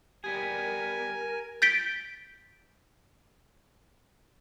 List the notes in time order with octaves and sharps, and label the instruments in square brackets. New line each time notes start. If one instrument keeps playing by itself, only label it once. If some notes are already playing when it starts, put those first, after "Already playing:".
[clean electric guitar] G3 B3 G#4 [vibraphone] G4 [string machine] A#4 [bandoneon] G#5
[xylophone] G6 A6 B6 D7 G7